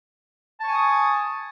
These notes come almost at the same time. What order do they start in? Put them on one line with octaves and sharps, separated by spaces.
A5 C#6 G#5 D#6